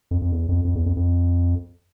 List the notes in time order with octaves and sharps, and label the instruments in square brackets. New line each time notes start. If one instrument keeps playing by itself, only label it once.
[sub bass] F2
F2
E2
F2
F2
E2
F2
F2